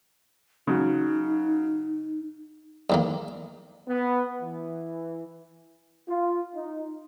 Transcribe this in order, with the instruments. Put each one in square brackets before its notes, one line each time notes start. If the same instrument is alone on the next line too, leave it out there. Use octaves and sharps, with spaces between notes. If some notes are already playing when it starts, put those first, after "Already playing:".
[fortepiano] C#3 F#3 [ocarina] D#4
[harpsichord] E2 D#3 A#3
[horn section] B3
E3
[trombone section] F4
D#4